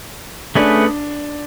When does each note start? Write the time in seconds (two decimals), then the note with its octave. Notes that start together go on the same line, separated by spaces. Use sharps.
0.55 A3 C#4 D4 G#4 B4